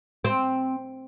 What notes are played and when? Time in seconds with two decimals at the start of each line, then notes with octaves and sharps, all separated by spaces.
0.25 C4